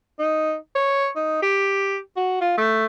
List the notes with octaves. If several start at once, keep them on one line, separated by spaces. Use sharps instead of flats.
D#4
C#5
D#4
G4
F#4
F4
A3